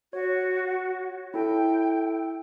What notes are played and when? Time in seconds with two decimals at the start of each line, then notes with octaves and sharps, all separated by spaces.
0.13 F#4 C#5
1.34 E4 A4 G5